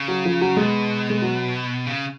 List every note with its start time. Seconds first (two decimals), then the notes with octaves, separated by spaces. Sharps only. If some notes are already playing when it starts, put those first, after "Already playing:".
Already playing: C#3
0.08 F#3
0.25 F3
0.41 F#3
0.57 B2 G#3
1.10 G#3
1.22 F#3
1.86 C#3